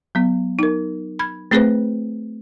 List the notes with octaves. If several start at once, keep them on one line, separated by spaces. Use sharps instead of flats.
F#3 B3
D#4 A#4
B5 G#6
A3 C4 G#4 B4 C5